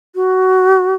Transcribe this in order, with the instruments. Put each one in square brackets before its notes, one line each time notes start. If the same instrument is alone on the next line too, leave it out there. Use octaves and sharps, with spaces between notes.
[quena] F#4